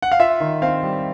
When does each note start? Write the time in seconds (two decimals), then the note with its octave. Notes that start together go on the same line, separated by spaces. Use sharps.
0.02 F#5
0.12 F5
0.20 F4 E5
0.40 D#3
0.62 C4 F5
0.83 G3